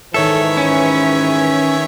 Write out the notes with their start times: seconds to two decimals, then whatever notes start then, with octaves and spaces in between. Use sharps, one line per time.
0.14 G#2 D#3 E3 A4 B4 C#5 E5
0.57 C#4